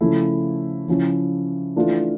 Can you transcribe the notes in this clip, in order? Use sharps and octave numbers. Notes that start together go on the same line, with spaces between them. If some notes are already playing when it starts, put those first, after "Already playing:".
C#3 F3 A3 E4
C#3 F3 C#4 E4
E3 A3 D4 F4